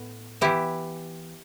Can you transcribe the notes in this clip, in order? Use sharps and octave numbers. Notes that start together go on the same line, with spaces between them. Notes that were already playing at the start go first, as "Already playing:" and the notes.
Already playing: A2 B3
E3 B3 E4 G4